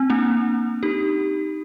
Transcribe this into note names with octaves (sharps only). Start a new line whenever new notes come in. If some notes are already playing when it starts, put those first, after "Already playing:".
Already playing: C4
A#3 D4
D#4 G4